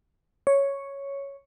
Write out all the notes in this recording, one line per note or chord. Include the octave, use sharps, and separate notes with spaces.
C#5